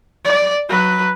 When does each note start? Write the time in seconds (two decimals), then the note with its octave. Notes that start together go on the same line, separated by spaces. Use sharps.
0.25 D5
0.69 F#3 B4